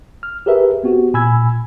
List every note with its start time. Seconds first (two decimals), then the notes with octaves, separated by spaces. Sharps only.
0.23 F6
0.46 G4 G#4 A#4 B4 E5
0.84 B3 C4 F#4 G4
1.14 A#2 G#5 B5 E6 G#6